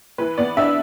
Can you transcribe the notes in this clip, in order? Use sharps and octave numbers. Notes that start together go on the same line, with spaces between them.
E3 B4
B3 D5
D4 E5